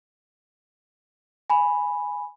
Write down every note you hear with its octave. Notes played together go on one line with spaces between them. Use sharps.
G#5 B5